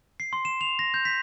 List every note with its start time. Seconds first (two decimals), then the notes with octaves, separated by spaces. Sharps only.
0.20 C7
0.33 C6
0.45 E7
0.61 F7
0.79 A#6
0.94 G6
1.05 B6